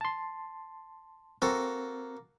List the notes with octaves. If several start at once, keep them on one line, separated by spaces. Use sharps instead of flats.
A5 C6
A#3 C4 F#4 A4